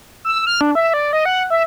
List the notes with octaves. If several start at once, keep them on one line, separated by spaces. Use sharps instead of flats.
E6
F6
D4
E5
D5
D#5
F#5
E5